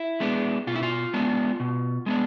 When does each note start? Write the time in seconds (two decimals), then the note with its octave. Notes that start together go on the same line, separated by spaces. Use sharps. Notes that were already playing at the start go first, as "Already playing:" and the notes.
Already playing: E4
0.20 G#3 B3 D4
0.67 B2 F4
0.75 E4
0.83 F4
1.14 G#3 B3 D4
1.60 B2
2.06 G#3 B3 D4